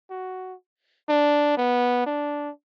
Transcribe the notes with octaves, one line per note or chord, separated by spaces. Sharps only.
F#4
D4
B3
D4